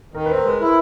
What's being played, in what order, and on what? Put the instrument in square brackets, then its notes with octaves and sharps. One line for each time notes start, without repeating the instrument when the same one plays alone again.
[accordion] D#3 [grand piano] A#4
[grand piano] B4
[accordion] C4
[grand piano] A#4
[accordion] G#3 [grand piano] B4
[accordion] E4